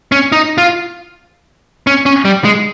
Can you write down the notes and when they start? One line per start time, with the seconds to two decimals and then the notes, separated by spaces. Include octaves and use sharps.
0.12 C#4
0.32 D#4
0.58 F4
1.87 C#4
2.06 C#4
2.25 G3
2.44 G#3